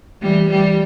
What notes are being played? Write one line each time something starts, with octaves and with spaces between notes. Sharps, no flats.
E3 G3
E3 G3